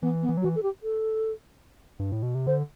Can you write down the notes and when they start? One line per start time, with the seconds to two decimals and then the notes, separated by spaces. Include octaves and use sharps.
0.02 E3 B3
0.22 B3
0.29 E3
0.37 F#3
0.42 E3 F#4
0.55 A4
0.63 G4
0.83 A4
1.99 G2
2.12 A2
2.23 B2
2.35 C3
2.47 D3 C5